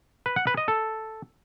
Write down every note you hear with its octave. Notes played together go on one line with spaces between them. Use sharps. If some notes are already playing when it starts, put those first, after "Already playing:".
B4
F#5
B4
D#5
A4